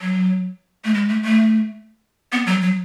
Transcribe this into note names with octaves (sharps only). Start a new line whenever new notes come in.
F#3
A3
G#3
A3
A3
B3
F#3
F#3